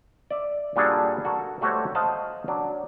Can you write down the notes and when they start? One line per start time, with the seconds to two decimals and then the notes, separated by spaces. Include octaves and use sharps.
0.30 D5 E5
0.76 A#2 G3 D4 F#4 G#4 A4
1.25 F#4 A4 A#4
1.61 G3 A3 F#4 G4 C5 C#5
1.95 C5 D#5 F5 F#5 A5
2.48 F#3 D4